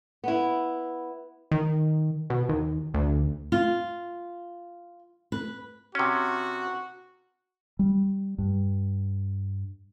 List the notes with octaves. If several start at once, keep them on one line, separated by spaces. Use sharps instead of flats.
B3 E4
D#3
B2
D#2
D2
F4
B4
C3 C#4 F#4
G3
G2